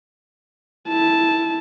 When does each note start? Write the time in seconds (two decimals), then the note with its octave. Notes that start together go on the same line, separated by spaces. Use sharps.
0.88 E4 A5